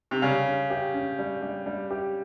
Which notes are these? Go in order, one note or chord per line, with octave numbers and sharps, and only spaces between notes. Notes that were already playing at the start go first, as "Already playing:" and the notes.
C3
C#3 G3
C#4
G4
C#4
G3
G3
G3
G4